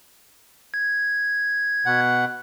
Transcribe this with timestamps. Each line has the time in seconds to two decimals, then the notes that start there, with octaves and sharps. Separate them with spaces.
0.74 G#6
1.86 B2 F#5